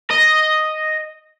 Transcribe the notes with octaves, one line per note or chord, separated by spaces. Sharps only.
D#5